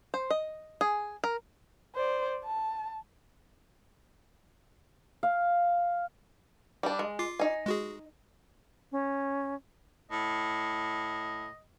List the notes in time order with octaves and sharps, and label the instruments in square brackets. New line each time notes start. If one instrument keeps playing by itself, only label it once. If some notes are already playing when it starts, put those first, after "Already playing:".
[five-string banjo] C5
D#5
G#4
A#4
[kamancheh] C5 D5
A5
[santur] F5
[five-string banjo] G3 D4
G#3
[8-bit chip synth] F4 D6 C7
[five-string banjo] D#4 G#5
[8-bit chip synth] G#3 F#4 G#4
[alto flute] C#4
[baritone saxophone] A2 [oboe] D#5